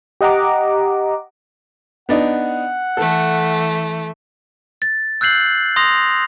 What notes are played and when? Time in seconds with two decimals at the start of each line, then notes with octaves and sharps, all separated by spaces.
0.21 G4 D#5 F#5 A#5 D6
2.09 B3 D4 D#4 F#5
2.97 E3 A3 A4
4.82 A6
5.21 E6 F#6 G6 C7 F#7
5.76 C6 D#6 A#6 F7